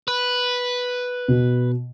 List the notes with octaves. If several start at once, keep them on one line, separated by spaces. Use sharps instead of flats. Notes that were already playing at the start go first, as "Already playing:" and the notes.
B4
B2